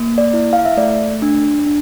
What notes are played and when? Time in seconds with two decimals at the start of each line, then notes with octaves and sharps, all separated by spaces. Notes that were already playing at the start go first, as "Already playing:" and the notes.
Already playing: A#3
0.18 D5
0.34 E4
0.53 F5
0.65 E5
0.77 A3 D5
1.22 D4
1.66 D4